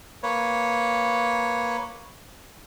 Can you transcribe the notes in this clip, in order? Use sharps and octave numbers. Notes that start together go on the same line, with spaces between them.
A#3 B4 C#5